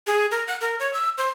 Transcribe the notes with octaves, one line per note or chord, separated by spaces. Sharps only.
G#4
A#4
F#5
A#4
C#5
E6
C5